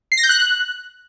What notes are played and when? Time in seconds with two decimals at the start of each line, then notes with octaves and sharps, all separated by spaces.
0.12 C7
0.18 A#6
0.23 G6
0.29 F#6